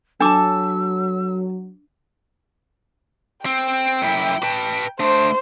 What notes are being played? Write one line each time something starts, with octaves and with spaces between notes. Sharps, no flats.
F#3 D4 A4 A5 D6 E6
C4 G5
F#2 E4
B4 A5
A3 D4 C5